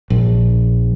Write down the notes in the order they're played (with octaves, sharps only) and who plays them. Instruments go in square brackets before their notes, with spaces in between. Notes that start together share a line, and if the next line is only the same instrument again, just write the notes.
[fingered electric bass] A#1